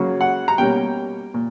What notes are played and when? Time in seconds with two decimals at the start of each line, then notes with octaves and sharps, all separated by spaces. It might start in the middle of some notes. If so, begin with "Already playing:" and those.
Already playing: C#3 F#3 A#3 C#4
0.21 F#5
0.48 A#5
0.58 B2 G3 A#3 C#4 G5
1.34 A#2